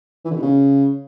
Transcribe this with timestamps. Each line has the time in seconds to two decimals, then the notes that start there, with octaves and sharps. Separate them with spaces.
0.25 E3
0.31 D3
0.36 B2
0.42 C#3